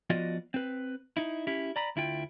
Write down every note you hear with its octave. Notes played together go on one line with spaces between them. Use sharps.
F3 B3 F4 F#4 D5 D#5
C4 B4
D#4 E4
C#4 E4 G4
D5 A#5 B5
D2 E4 F4 G5